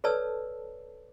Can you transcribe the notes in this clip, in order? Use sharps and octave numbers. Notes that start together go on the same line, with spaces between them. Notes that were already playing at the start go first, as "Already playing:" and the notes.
A4 B4 C#5 D5 A5 E6